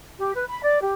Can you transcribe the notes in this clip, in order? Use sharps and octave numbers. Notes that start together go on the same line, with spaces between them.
G4
B4
B5
D5
G4